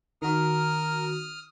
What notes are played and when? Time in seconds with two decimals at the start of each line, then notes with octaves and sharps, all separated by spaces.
0.22 D#3 F#4 A#4 D#6 F6